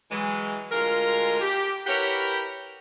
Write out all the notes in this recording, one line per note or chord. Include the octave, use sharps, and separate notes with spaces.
E3 F#3 G#3
D2 G#3 F4 A#4
G4
E4 G4 A#4 B4 C#5 F#5